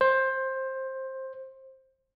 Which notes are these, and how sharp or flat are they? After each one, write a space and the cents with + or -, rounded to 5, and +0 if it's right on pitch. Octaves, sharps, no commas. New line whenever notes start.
C5 +15